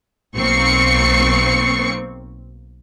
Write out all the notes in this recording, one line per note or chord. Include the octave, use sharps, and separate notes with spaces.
B1 A#3 C4 C#6 C7 C#7